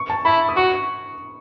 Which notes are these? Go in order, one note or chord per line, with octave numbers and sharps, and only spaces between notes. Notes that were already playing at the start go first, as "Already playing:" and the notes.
Already playing: C#6
A5
E4 B5
D#6
F#4 C#6